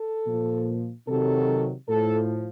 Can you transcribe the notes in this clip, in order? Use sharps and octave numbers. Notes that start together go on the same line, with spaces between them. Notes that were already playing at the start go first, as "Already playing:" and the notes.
Already playing: A4
A#2 F3
C3 D#3 F#3 A4
A2 F3 A4